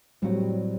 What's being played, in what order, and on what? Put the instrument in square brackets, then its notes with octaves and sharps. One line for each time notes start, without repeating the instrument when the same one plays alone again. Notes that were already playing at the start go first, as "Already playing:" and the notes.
[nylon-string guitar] A2 F#3 C4 F#4 [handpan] G3